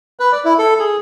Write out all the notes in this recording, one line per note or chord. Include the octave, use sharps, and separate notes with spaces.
B4
D5
E4
A4
G#4